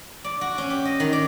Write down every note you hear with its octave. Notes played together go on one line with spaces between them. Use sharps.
D5
F#4
C#4
G4
D#5
D#3
D5